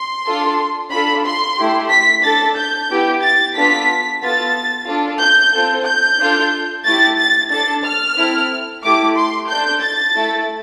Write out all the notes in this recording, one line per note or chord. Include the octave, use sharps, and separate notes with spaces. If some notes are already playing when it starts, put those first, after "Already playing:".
Already playing: C6
D4 F4 A4
D4 F4 A4 B5
C6
A3 E4 G4
B6
D4 A4 A6
G6
B3 E4 G4
A6
B3 D4 F4 A4 B6
B3 F4 A4 A6
D4 F4 A4
G6
C4 F4 A4
G6
D4 F4 A4
A3 E4 G4 A6
A6
D4 A4 A6
F6
C4 E4 A4
A3 E4 G4 D6
C6
D4 A4 G6
A6
A3 E4 A4